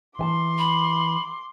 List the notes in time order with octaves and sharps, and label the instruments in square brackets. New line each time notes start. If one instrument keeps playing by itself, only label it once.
[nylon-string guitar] E3 G#5 A5 [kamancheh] C6 D6
[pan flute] B5